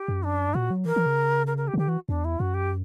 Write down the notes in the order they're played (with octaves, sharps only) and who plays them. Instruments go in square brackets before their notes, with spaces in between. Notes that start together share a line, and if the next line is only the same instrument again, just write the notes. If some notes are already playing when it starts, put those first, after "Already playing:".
Already playing: [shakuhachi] G4
[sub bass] F#2
[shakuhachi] D4
[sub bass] G2
[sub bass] A#2 [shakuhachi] F#4
[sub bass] F#3
[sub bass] E3 [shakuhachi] A#4
[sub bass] E3
C#3
[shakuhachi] A#4
A#4
G4
[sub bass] C#3
[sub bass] D3 [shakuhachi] G4
[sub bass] E3 [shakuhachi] F#4
[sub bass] E2 [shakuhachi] D4
[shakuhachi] E4
[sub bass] F#2 [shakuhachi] F#4
[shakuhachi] G4